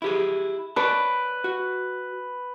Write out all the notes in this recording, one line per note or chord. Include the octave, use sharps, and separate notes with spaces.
E4 G4 G#4
B4 C#5 D5 A5
F#4